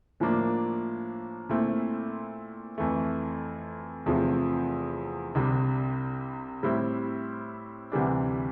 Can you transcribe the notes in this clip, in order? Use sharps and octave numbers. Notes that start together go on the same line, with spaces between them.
A2 F3 A#3 D4
A#2 A3 C4 E4
F2 E3 A3
E2 C3 F3 A3 C4
C2 C3 G3 D4
A2 G3 C4 E4
D2 C3 E3 G3 D4